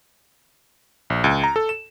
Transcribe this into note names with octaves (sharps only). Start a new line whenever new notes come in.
A#1
C#2
A#5
A4
E7